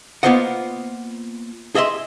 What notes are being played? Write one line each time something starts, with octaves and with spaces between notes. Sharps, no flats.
A#3 B3 F4 C5 D#5 F#5
G#4 D#5 E5 C6